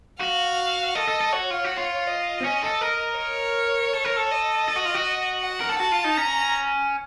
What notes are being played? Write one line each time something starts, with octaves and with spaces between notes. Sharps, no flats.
F#4 F5
A4 D#5
A4
A4
F#4 C#5
F4
F#4
F4
D#5
C4
C#4
A4
A#4
C#5
A4
A#4
A4
D#5
A4
F#4
F4
F#4
F#5
A#4
A4
F#4 A5
F4
D#4
C#4 A#5